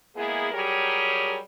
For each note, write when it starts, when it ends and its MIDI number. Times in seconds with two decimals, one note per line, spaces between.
0.15 0.51 56
0.15 0.51 58
0.15 0.51 59
0.15 0.51 64
0.15 0.51 68
0.51 1.37 54
0.51 1.37 55
0.51 1.37 67
0.51 1.37 68
0.51 1.37 70
0.51 1.37 73